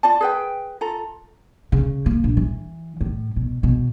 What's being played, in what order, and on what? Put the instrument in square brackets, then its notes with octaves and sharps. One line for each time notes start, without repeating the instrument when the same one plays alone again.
[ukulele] F4 D5 A5
G#4 B4 G5
F4 A4 A#5
[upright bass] C#3
A#3
A#1
E3
A2
B2
B2